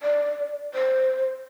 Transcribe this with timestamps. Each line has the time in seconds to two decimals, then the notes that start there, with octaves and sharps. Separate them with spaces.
0.02 D5
0.74 C5